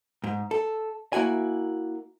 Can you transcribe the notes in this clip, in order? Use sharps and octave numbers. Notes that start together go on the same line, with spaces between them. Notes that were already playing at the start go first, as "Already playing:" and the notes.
G#2
A4
A#3 E4 F#4 G#5